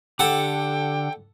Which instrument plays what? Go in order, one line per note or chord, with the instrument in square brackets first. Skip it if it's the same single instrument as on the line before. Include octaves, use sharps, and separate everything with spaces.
[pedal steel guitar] D3 G4 [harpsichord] A4 F#5 [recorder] G5